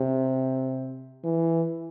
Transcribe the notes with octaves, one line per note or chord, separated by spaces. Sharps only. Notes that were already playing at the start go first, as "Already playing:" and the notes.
Already playing: C3
E3